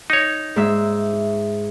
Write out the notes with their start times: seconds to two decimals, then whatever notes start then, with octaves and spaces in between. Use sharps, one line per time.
0.10 D#4 C#5
0.56 G#2 E5